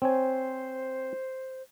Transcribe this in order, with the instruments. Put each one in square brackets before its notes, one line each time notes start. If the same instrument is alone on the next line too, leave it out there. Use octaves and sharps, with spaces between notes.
[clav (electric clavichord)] C4 C#5 G#5 [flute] C5